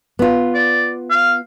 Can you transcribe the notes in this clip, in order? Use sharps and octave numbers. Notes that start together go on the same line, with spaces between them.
B3 F4
D5
F5